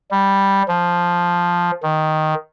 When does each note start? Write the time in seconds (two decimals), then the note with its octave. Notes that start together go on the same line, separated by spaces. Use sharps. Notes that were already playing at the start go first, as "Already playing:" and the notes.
0.11 G3
0.68 F3
1.83 D#3